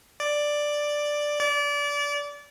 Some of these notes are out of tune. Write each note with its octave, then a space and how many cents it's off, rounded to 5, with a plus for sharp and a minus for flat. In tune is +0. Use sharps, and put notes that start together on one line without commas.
D5 +5
D5 -25